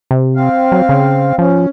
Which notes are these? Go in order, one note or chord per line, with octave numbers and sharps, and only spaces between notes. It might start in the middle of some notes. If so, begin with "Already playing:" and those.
C3
C4 F5
F#3
C#3
F3 C#4